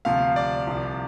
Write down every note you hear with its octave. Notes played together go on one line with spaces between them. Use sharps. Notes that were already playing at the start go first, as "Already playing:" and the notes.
D2 C3 F3 F5
D5
C2 C3 F3